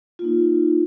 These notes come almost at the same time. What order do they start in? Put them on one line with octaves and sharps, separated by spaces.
F4 A#3 D#4